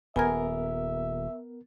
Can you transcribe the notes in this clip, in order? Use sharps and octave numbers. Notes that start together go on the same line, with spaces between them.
D#1 B3 A#4 E5 G#5 B5 G#6